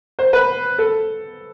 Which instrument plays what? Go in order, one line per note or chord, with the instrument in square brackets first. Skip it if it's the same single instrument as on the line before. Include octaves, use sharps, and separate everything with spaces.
[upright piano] C5
B4
A4